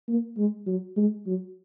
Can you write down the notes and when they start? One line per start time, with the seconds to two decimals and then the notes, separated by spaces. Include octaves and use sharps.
0.08 A#3
0.37 G#3
0.66 F#3
0.97 G#3
1.26 F#3